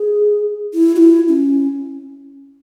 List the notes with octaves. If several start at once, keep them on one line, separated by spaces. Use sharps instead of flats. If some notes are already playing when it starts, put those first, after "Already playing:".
Already playing: G#4
E4
F#4
E4
C#4